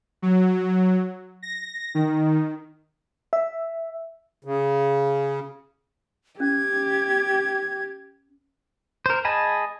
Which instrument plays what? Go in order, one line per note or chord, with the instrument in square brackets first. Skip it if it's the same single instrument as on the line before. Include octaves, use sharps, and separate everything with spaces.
[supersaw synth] F#3
A#6
D#3
[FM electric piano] E5
[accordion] C#3
[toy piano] C#4 [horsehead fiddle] G4 [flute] G#6
[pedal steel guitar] A#4 C5
G#4 D#5 G#5 A5 B5